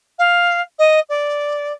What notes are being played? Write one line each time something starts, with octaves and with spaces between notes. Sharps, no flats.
F5
D#5
D5